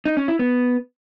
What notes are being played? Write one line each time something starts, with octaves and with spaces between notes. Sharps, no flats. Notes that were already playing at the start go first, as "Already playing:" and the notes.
D#4
C#4
E4
B3